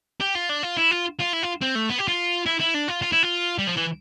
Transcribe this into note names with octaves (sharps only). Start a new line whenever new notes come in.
G4
F4
D4
F4
E4
F4
F4
E4
F4
C4
A3
B3
G4
F4
E4
E4
D4
F4
F4
E4
F4
G3
F3
E3